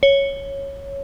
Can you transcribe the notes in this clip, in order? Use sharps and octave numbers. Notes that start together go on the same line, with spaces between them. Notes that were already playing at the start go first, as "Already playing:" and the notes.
C#5